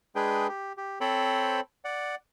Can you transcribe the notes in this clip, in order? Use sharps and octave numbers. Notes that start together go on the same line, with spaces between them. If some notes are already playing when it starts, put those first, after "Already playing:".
G#3 D4 G#4 B4 G5
G4
G4
C4 A4 C5 C#5 G5 B5
D5 F#5